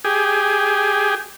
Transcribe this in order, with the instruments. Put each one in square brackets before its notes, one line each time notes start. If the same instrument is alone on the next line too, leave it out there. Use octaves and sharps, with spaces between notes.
[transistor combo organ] G4 G#4